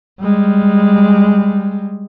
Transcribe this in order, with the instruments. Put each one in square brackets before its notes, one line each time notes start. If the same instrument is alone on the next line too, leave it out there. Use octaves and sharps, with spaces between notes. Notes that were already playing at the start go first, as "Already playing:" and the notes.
[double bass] G3 G#3